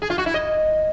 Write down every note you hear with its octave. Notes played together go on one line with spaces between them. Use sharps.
G#4
F4
F#4
E4
D#5